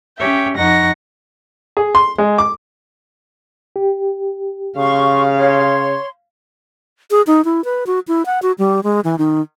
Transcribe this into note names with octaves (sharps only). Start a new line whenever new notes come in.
C#4 G4 C#5 E5 G5
F2 D#4 F#5 C#6 A#6
G#4
C6
G#3
D6
G4
C#3 F5 C6 C#6
C#5 C6
G#4
D#4
E4
B4
F#4
E4
F#5
F#4
G3
G#3
E3
D#3